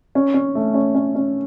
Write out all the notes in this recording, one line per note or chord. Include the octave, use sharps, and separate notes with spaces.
C#4
C#4
A3
C#4
C#4
C#4